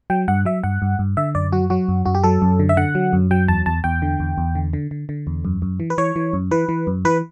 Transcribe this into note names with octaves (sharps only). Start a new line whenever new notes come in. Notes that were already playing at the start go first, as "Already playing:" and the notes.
F#3 G5
G2 F#5
F#3 E5
G2 F#5
G2
G2
D3 E5
F#2 D5
F#3 F#4
F#3 F#4
F#2
F#2 F#4
G4
F#3 A4
F#2
D3
E5
D3 F#5
F#3
F#2
F#3 G5
E2 A5
E2 A5
E2 G5
D3
E2
E2
D3
D3
D3
D3
E2
F#2
F#2
E3
B4
E3 C#5
E3
F#2
E3 B4
E3
F#2
E3 B4